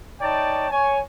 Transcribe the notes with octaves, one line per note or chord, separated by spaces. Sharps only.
D#4 C#5 D5 G5 A5
C#5 G#5